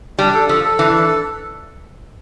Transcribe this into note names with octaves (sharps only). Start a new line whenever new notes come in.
G3 D4
A4
F3 A4
A4
E3 D4
A4